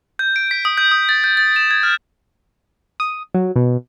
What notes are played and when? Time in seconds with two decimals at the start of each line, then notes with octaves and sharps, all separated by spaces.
0.19 G6
0.36 D7
0.51 B6
0.65 D#6
0.78 G6
0.92 D#6
1.09 A6
1.24 G6
1.37 A6
1.56 E7
1.71 G#6
1.83 F6
3.00 D#6
3.34 F#3
3.56 B2